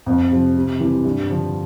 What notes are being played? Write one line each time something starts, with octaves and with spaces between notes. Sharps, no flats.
F2
C3 F3
C3
E3 G3 C4 G4
G2
D3 F3